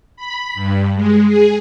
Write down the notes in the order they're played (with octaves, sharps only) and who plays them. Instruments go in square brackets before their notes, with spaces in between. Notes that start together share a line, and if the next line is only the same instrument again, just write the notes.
[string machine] B5
G2
G#3
G#4